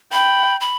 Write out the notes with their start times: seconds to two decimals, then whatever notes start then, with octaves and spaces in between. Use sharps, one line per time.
0.12 G5 B5
0.61 B5